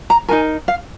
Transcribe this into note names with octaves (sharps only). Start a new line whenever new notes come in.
A#5
D#4 F#4 A#4 G#5
F5